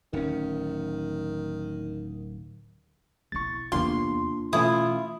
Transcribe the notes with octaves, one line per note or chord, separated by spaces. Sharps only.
D1 D#3 C#4
B1 E4 C#6 A6
E2 C3 A#3 D4 F4 C6
B2 E3 A3 C#4 E4 F4 D#6